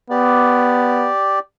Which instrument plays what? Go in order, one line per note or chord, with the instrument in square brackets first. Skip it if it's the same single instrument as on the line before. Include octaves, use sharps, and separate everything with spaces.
[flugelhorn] B3 [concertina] G4 D5